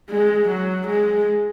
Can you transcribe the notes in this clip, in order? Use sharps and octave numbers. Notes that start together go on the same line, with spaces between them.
G#3
F#3
G#3